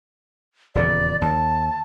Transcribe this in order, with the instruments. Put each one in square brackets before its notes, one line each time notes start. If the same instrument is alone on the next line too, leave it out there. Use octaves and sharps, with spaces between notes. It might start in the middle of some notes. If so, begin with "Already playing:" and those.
[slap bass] D#1 E2 C#3 [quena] D5
[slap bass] D#2 [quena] A5